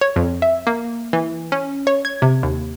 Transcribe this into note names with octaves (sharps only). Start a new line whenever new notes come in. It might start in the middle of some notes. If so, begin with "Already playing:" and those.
C#5
F2
E5
A#3
E3
C#4
C#5
G#6
C3
D#2